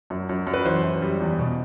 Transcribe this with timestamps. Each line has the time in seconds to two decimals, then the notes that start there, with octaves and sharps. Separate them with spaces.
0.10 F#2
0.29 F#2
0.47 F#2
0.54 B4
0.65 E3 C5
0.84 F#2
1.02 G3
1.21 E2
1.39 B2